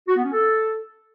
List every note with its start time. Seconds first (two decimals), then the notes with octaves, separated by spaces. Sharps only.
0.08 F#4
0.16 B3
0.24 C#4
0.33 A4